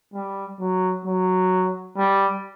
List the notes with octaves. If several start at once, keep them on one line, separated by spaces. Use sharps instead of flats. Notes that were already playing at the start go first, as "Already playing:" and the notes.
G3
F#3
F#3
G3